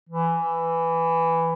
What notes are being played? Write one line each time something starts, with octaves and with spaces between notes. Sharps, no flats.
E3